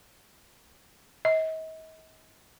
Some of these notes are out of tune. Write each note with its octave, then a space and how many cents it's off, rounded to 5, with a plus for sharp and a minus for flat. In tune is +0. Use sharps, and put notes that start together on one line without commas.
D#5 +40